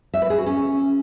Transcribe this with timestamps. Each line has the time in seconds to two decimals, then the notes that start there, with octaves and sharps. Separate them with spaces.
0.14 E5
0.22 B4
0.30 G#4
0.38 F#4
0.46 C#4